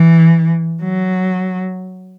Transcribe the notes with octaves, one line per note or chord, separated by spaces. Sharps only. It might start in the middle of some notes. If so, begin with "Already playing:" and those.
Already playing: E3
F#3